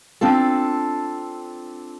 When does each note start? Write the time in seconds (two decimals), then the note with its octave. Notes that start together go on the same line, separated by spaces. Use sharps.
0.21 C4 D4 F4 A4